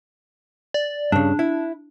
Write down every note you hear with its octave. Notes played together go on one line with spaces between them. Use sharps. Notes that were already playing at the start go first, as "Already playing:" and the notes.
D5
G2 C#3 D4
E4